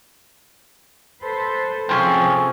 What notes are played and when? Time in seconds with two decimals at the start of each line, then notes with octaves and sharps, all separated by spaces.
1.23 A4 B4 C5
1.89 C3 F3 C4 C#4 G#4 A4